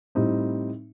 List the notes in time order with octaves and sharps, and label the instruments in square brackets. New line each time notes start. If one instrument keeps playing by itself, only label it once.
[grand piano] A2 G3 C4 D#4